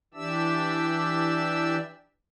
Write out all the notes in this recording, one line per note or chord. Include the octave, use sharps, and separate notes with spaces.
E3 D4 G4 D5 E5 E6